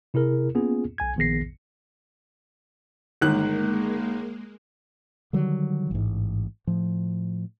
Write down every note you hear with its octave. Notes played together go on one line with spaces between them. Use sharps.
C3 E4 G#4 A#4
A#3 B3 C#4 F4 G#4
B1 G#5 G#6
A#1 D#3 B3 G#4 A#6 C7
G1 D#3 G#3 A#3 F#6
D3 D#3 F#3 G3
A1 G#2
A2 F3